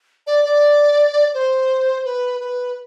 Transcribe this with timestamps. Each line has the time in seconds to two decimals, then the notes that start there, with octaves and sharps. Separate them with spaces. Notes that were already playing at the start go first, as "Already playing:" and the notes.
0.27 D5
0.45 D5
1.34 C5
2.05 B4
2.41 B4